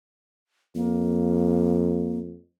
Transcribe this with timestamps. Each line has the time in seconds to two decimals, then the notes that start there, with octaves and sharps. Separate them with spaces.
0.75 F2 A#3